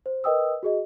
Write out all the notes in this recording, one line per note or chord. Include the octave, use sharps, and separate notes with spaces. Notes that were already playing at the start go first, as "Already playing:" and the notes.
C5
A#4 B4 D#5 G5 D#6 E6
F#4 G#4 D#5